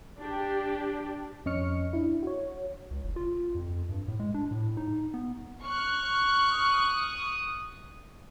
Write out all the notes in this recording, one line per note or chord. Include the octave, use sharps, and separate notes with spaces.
D4 G4
F2 C#4 D#5 C#6 F6 C#7
D4 E4
F#4 C#5
C#2
F#1
F4
F2
G2
A2
G#3
D4
A2
D#4
B3
C#6 F6 F#6
D#6